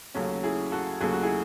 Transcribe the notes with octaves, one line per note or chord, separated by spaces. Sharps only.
D#2 C#3 F#3 A3 C#4
E4 G#4
F#4 A4
D#2 C#3 F#3 A3 G#4
F#4
E4 G#4